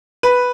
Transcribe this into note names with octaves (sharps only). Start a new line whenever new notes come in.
B4